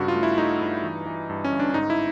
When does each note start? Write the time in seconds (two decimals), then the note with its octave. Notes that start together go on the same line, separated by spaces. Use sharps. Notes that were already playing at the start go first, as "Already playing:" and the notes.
Already playing: G2 C#3 F#4
0.08 F4
0.15 A3
0.23 E4
0.38 A3 D#4
0.61 G2
0.84 E3
1.06 E3
1.29 G2
1.44 C#4
1.52 G1
1.59 D4
1.70 D4
1.74 G#2 D#4
1.90 E4